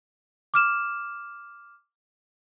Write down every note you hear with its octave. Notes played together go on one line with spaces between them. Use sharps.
D6 F6 E7